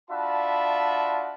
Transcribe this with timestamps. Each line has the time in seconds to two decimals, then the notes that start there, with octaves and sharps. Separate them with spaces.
0.10 D4 F4 F#4 E5 A5 B5